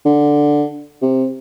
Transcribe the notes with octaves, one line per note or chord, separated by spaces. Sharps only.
D3
C3